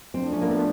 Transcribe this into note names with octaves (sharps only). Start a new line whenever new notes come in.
A2 F3 A3 C4 D4
C#4
A#3
B3